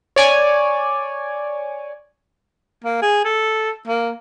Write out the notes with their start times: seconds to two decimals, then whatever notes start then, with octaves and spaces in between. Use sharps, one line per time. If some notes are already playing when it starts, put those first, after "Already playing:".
0.16 C#5 D5 G#5
2.84 A#3
3.02 G#4
3.24 A4
3.87 A#3